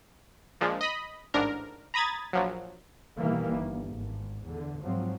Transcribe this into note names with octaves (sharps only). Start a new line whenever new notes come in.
A#2 F3 G#3 D4
D#5 B5
A1 G#2 D4 A#4
A#5 B5 D#6 G#6 A6
A#1 F3 F#3
B2 D#3 E3 G3 A#3
G1
G#1
E2 D3
G#2 F3 F#3 C4